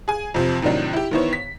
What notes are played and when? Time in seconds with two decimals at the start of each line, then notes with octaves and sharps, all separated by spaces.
0.08 G#4 G#5
0.34 F2 C3 F3
0.62 A2 C3 D#3 F#3 D4 D#4
0.93 E4 G4
1.11 D#3 E3 B3 E4 C5 C#5
1.33 B6